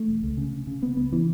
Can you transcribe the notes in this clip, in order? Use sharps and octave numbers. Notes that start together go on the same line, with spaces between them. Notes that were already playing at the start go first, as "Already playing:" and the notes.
Already playing: A3
E1
C#2
C#3
C#3
C#3
C#3 B3
C#2 B3
C#3 E3